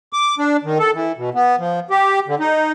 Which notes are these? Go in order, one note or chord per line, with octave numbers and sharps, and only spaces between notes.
D6
D4
D#3
A4
E3
B2
B3
F3
G4
D3
D#4